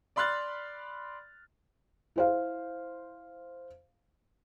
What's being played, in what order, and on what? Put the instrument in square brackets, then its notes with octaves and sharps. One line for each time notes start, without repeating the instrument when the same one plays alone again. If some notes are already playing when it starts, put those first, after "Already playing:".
[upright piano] D5 B5 C6 F6 F#6 A6
[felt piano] E4 C5 F5